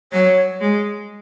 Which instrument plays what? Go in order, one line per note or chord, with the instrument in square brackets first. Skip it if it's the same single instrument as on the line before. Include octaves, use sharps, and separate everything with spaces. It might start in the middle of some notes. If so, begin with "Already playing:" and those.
[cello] F#3 [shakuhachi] C#5
[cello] G#3